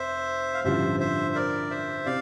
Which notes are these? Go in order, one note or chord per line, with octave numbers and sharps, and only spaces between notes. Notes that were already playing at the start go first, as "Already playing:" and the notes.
Already playing: F1 C3 C5 E5
F5
A1 G2 D3 F3 C5 E5
C5 E5
A#4 D5
C5 E5
C3 D5 F5